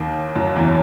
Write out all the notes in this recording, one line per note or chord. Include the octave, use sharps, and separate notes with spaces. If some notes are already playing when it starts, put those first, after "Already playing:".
Already playing: D#2 D#3
F#2 F#3
E2 E3